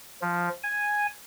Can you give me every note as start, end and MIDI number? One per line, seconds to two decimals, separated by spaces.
0.22 0.49 53
0.63 1.07 80